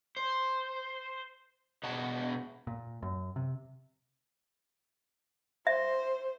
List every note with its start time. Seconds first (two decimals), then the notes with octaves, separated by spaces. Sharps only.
0.17 C5
1.83 B2 B3 F#4 G#4 A5
2.67 A#2
3.03 F#2
3.36 C3
5.67 C5 E5